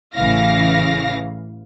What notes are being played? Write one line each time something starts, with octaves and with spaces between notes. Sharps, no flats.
A1 C#3 E3 F5 A#6